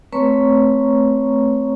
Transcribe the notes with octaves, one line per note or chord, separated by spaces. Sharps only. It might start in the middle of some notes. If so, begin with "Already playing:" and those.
A3 C4 B4 C#5 A#5 C#6